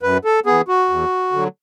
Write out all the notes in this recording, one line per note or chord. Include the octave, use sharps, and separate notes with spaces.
F#2 B4
A4
E3 B3 G#4
F#4
E2
D3 F#3